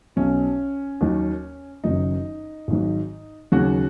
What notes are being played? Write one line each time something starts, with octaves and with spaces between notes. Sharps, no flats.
B1 B2 F#3 C#4
D#2 D#3 F#3
F#1 F#2 D#3 F#3 D#4
G#1 G#2 D#3 F#3
D#2 C#3 F#3 F#4